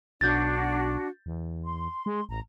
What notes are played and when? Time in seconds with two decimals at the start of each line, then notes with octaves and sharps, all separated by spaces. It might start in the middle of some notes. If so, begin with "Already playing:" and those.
0.21 B1 D4 F#4 G6 A6
1.26 E2
1.65 C6
2.06 G#3
2.29 A1 A#5